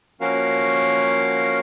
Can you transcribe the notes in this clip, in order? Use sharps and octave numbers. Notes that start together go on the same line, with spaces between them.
F3 A#3 C#4 F#4 A#4 F5